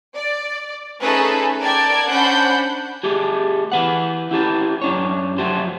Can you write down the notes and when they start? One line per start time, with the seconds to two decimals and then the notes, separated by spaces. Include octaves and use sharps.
0.14 D5
0.99 A3 C#4 D#4 G#4 A4 B4
1.60 A#4 D5 G5 A5 G#6
2.08 C#4 D4 C5 F#5 B5 G6
3.03 A3 G4 G#4
3.72 E3 B4 F#5
4.31 E4 G4 A4 B4
4.82 F#2 D4 C#5
5.38 F3 F#3 A3 G4 C5